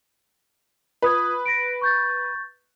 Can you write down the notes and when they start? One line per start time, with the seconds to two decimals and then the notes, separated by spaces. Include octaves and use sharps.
1.02 F4 B4 D#6 G#6
1.46 A#6 B6 D7
1.81 C#6 G6 A6